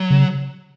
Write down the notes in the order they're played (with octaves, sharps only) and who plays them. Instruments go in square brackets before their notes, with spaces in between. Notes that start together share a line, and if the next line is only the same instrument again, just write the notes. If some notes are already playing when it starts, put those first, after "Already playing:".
Already playing: [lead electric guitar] F#3
[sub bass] C#3